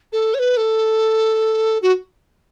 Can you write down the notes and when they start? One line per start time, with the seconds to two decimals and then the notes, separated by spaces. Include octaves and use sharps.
0.12 A4
0.34 C#5
0.39 B4
0.57 A4
1.82 F#4